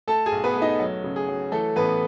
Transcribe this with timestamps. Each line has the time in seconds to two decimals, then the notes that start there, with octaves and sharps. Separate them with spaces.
0.07 A3 A4 A5
0.26 G#4 G#5
0.32 B1
0.44 B3 B4
0.56 A3
0.62 D#4 D#5
0.80 F#3
1.04 C#3
1.16 G#4
1.28 F#3
1.52 E3 A3 A4
1.76 A1 B3 B4